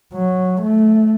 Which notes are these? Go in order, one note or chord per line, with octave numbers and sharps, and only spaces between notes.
F#3
A3